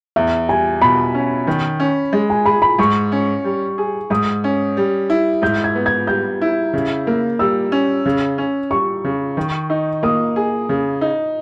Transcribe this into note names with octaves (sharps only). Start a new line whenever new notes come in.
E2 E5
G3 G#5
B2 B5
C#4
D#3
C#4
G#3
G#5
G#4 B5
B5
G#2 C#6
C#4
G3
G#4
G#2 D#6
C#4
G3
E4
G#2 G6
G#6
B3
G#6
G3 G6
E4
C#3
A#3
G3 E6
C#4
C#3
C#4
G3 C#6
C#3
D#3
D#4
A#3 D#6
G#4
C#3
D#4